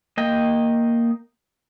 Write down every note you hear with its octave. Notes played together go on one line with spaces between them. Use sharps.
A#3 D#5 G5